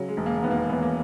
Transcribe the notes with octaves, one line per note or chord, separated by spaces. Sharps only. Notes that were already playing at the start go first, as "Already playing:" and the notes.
Already playing: C#3 F#3
G#3
E1
A#3
A#3
D#2 B3
A#3
B3
E3 B3
A#3